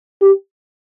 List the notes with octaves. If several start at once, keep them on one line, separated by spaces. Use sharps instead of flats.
G4